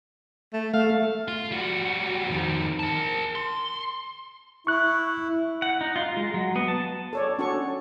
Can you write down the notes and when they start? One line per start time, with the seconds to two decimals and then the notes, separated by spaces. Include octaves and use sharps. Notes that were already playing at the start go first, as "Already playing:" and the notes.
0.53 A3
0.74 A3 F5
1.28 F4
1.52 G3 F#4
2.29 F2 D#3
2.79 A#4 A5
3.35 C6
4.67 E4 C#6 F#6
5.62 F#5
5.81 D#4
5.96 F4
6.17 G#3
6.34 F#3
6.56 B3
6.68 A5
7.13 A4 C#5 D5
7.39 C#4 D4 F#4 A4 C#5 C#6